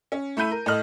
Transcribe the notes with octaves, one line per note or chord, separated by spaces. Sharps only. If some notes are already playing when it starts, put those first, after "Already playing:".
C#4
A3 E4 B5 G6 D#7
A#4
A2 A4 D#5 F6 F#7